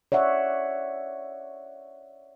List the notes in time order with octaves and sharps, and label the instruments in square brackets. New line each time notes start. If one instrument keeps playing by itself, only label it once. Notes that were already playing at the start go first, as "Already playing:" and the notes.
[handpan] C#5 D5 E5 F#5